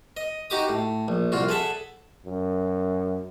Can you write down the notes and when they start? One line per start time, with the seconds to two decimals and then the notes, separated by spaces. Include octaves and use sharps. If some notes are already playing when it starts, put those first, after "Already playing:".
0.17 D#5
0.50 D#4 F#4 G4 D6 D#6
0.69 A2
1.08 A#1
1.32 C2 F4 F#4
1.48 G#4 A4 E5 F#5
2.26 F#2